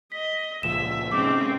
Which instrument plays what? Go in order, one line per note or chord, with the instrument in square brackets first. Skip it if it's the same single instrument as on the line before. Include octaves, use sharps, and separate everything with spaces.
[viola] D#5 [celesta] B6
[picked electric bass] C#2 A#2 F3 [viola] E5 [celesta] E7
[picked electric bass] G#2 C3 [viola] G#3 C#4 [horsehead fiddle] C4 [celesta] D6